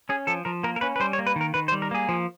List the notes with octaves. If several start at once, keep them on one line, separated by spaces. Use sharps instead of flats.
C#4 G#4
F3 A4
F3 A#4
A#3 A#4
A#4
C#4 B4
B4
G3 C5
C#5
A#3
B4
D#3 A#4
D#3 B4
C5
G3
A#4
A#3 G#4
F3